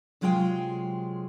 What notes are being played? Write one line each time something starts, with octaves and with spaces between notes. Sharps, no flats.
C3 F#3 G#3 F4 G#4 G5